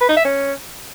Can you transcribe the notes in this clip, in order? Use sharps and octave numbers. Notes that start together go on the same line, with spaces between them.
B4
D#4
E5
C#4